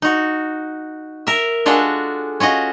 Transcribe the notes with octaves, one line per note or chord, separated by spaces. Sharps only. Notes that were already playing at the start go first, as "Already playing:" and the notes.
D#4 F#4
A#4 E5
G#3 D4 F4 F#4 G#4 A4
C#4 F4 F#4 D#5